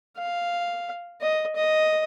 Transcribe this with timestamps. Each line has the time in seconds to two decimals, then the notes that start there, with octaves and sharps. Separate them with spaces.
0.18 F5
1.21 D#5
1.56 D#5